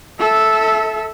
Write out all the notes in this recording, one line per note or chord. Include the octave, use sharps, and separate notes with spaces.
A4 E5